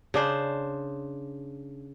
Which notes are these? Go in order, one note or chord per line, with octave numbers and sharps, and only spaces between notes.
C#3 D4 C5